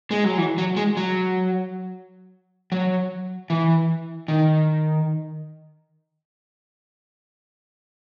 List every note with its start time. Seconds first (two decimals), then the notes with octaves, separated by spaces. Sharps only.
0.11 G#3
0.24 F#3
0.38 E3
0.58 F#3
0.77 G#3
0.97 F#3
2.72 F#3
3.50 E3
4.28 D#3